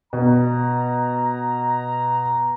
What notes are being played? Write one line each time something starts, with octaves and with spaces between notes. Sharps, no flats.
B2 A#5